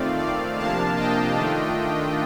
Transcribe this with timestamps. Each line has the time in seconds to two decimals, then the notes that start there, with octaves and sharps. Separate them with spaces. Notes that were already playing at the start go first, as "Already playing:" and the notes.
Already playing: D#3 A3 C4 F4 D5 F5
0.19 D5 F5
0.57 C3 F3 A#3 D4 F5 A5
0.96 D#5 G5
1.36 D#3 A3 D4 F4